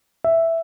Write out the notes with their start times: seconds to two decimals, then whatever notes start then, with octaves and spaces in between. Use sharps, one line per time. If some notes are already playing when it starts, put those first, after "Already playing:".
0.24 E5